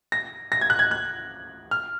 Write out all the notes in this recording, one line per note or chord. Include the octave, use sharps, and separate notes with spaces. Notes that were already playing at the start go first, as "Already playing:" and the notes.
A#6
A#6
G#6
F#6
G#6
F#6
F6